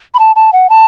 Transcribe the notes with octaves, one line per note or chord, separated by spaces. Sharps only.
B5
A5
A5
F#5
A5